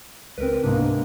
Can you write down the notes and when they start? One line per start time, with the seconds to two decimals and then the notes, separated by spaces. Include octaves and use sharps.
0.38 C#2 C4 A#4 B4
0.63 G#2 C3 G#3 A#3 B3 D4